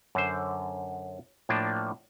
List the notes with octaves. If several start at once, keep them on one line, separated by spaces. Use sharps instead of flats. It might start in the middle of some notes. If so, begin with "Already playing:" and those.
F#2 D3 C5
A2 F3 A#3 D4